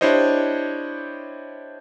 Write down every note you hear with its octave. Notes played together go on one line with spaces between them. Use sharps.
D4 E4 G4 C5 C#5 D#5